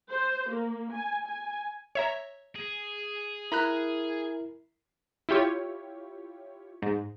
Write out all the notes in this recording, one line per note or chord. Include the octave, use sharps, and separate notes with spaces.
C5
A#3
G#5
G#5
C#5 E5 A#5
G#4
E4 A#4 A#5 B5 F#6
E4 F4 G4 C#5
G#2